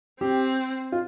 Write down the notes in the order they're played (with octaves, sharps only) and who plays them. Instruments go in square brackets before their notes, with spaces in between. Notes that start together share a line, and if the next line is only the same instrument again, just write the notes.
[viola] C4 [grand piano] G4
[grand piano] F4